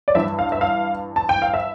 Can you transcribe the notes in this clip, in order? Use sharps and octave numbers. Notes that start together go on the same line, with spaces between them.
D5
G2 E3 E5
F5
E5
F5
A5
G5
F5
E5